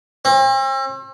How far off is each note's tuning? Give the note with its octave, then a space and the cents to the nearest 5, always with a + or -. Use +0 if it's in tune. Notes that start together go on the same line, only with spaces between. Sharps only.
C4 +45